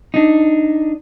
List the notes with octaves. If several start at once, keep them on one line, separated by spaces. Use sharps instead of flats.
D4 D#4